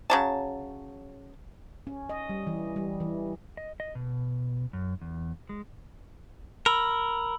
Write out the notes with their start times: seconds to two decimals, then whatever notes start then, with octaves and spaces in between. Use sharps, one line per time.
0.10 C#3 F#3 A5
1.87 C#4
2.10 D#5
2.29 G3
2.47 E3
2.76 G3
3.00 E3
3.57 D#5
3.80 D#5
3.95 B2
4.73 F#2
5.01 E2
5.49 G#3
6.66 A#4 B5 E6 F#7